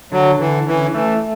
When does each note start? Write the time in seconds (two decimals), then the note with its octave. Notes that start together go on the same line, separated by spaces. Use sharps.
0.12 D3 F#3
0.39 D3 E3
0.67 E3 C#4
0.94 E3 A3